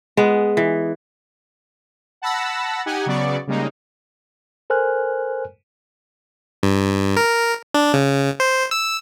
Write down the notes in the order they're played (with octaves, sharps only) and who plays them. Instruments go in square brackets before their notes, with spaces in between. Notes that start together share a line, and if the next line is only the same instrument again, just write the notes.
[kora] G#3 B3
E3
[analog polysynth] F#5 A5 B5 E6 A#6
D#4 G4 F#5 G#5
C#3 F#3 B3 D5 C#6
C#3 G3 G#3 A#3 D#4
[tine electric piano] A4 A#4 C5 G#5 F6 F#6
[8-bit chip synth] G2
A#4
D4
C#3
C5
E6